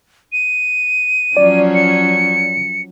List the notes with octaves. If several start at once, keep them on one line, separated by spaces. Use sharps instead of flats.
D#7
F3 F#3 C#4 D5
C#7